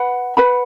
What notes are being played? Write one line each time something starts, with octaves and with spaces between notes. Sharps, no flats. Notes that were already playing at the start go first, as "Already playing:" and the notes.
Already playing: B4 F#5 B5
B4 F#5 B5